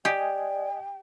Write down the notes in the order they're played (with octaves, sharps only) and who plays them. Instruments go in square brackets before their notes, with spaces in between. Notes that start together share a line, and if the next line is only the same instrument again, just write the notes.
[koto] G4 [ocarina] D5 [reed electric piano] D#5 G#5 [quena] G5